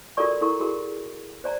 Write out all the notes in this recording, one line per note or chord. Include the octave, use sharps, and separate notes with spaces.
F4 F#4 A4 A#4 D5 C#6
E4 A4 A#4 C#6
F#4 G#4 A#4
C5 D5 A#5